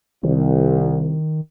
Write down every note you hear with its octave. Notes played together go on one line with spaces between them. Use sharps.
C2 D#3